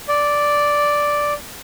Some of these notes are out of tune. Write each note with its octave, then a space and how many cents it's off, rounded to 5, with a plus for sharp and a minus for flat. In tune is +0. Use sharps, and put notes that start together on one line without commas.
D5 -5